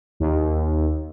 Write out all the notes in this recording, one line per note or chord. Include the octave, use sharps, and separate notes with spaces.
D#2